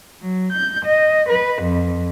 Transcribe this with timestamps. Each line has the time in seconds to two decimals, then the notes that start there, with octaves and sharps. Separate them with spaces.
0.21 F#3
0.53 G6
0.85 D#5
1.29 B4
1.62 F2